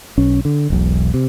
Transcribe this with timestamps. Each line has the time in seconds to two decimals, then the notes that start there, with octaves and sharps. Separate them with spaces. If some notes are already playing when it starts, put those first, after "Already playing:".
0.18 B1 C#4
0.45 D3
0.70 E1 B1
1.14 C3